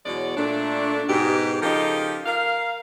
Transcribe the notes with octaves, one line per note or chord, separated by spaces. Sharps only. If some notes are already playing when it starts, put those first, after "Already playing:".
E2 B2 F#3 G#3 C#5 D5
A#2 A3 D4
G#2 B2 G4
C#3 F3 D#4 G4 A4 A#4
A#4 F5